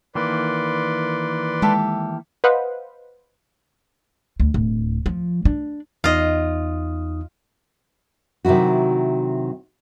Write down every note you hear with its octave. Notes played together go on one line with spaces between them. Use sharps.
D#3 E3 A#3 B4 D5 C6
G#3 G4 A4 E5
B4 C5 D#5 F5 F#5
D2
D1
F3
D4
E2 D#4 F4 D#5 D#6
C3 D#3 F#3 E4 F#4